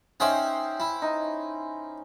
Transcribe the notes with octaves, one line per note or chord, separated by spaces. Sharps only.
C#4 D#4 C5 E5 F#5 G5
E4
D#4